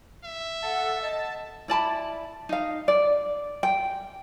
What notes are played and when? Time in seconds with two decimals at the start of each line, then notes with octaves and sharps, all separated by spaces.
0.24 E5
0.62 A4 F#5
1.02 D#5 A5
1.68 E4 D5 A5 B5
2.49 D#4 F5
2.88 D5
3.63 G5